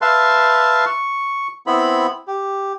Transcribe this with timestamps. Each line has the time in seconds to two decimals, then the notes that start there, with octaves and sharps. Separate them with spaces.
0.02 B4 E5 F5 A5 C6
0.86 C#6
1.67 B3 C4 E4 B5
2.28 G4